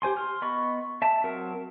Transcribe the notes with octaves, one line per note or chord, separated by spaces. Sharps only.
G4 C5 G#5 C6
C6 F6
B3 D#5 B5 C#6
E5 A5
F#3 C4 A#4 F#5